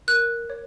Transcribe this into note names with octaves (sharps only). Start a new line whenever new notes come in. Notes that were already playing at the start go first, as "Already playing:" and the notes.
A#4 F#6
C#5